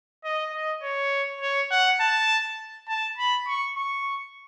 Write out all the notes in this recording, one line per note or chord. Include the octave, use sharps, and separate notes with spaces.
D#5
D#5
C#5
C#5
F#5
A5
A5
B5
C#6
C#6